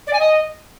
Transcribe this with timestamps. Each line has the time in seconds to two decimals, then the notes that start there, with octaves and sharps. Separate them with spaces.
0.07 D5
0.13 G#5
0.19 D#5